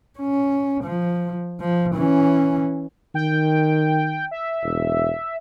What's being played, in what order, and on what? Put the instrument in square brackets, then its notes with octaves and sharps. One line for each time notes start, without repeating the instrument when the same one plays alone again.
[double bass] C#4
F3
F3
E3 C#4
[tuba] D#3 [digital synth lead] G5
[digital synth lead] E5
[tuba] E1